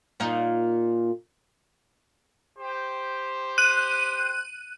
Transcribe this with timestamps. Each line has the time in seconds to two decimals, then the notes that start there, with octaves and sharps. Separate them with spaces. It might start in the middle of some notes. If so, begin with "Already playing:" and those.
0.20 A#2 A#3 D#4
2.59 G4 C5
3.58 F#6 D#7